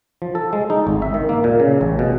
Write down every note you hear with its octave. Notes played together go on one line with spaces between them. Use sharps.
F3
A4
G#3
D#4
G#1
E5
D#3
A#3
A#2
C#3
A1
B2